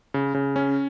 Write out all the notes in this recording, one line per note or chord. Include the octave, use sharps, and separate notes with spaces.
C#3
C#3
C#4